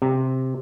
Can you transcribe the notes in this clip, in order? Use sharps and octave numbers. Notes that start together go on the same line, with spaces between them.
C3